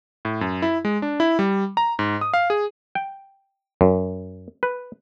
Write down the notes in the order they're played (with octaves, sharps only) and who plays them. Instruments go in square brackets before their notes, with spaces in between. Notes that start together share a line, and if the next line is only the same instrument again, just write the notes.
[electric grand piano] A2
F#2
E4
G#3
D4
E4
G3
A#5
G#2
D#6
F5
G#4
[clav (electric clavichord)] G5
F#2
B4